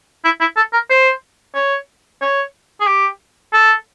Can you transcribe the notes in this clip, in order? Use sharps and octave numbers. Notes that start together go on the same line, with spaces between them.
E4
E4
A4
A#4
C5
C#5
C#5
G#4
G4
A4